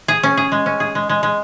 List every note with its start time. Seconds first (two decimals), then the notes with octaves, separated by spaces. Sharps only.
0.08 G#4
0.23 C#4
0.37 G#4
0.52 G#3
0.66 C#4
0.80 G#4
0.95 G#3
1.09 G#3
1.23 G#3